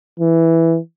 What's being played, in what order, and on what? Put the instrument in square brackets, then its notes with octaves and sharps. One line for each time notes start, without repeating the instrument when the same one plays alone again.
[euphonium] E3